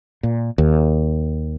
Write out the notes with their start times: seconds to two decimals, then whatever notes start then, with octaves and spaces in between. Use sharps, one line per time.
0.23 A#2
0.58 D#2